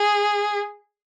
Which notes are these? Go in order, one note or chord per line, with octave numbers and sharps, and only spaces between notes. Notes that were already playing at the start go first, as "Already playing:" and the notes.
Already playing: G#4